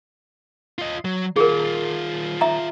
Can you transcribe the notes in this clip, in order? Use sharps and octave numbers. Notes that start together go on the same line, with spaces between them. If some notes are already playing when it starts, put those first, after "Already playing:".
F4 D#5
F#3
D#3 F4 G#4 A#4
E5 A#5